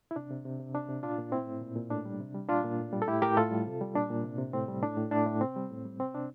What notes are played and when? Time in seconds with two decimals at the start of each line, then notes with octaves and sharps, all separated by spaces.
0.11 E4
0.16 C3 D4
0.30 C3
0.45 C3
0.59 C3
0.74 C3 D4
0.88 C3
1.03 A#2 D4 F4
1.18 A#2
1.32 A2 C4 E4
1.47 A2
1.61 A#2
1.76 A#2
1.91 A2 D4
2.05 G3
2.20 C3
2.35 G3
2.49 A#2 D4 F4
2.64 A#2
2.78 A2
2.93 G3
3.02 A4
3.07 A2 E4 G4
3.22 A2 G4 A#4
3.37 A2 F4 A4
3.51 G3
3.66 C3
3.81 G3
3.95 A#2 D4
4.10 A#2
4.24 C3
4.38 C3
4.53 A2 C4
4.68 G3
4.83 A2 D4
4.97 A2
5.11 A2 D4
5.26 A2
5.41 C3 C4
5.56 G3
5.70 A2
5.85 G3
5.99 C3 C4
6.14 C3 D4